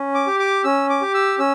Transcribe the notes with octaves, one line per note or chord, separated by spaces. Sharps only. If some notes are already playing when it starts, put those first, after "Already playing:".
Already playing: C#4
D6
G4
D6
C#4 E6
D6
G4
E6
C#4 E6